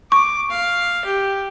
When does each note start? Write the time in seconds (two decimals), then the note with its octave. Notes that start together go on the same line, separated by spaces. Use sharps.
0.12 C#6 D6
0.50 F5
1.05 G4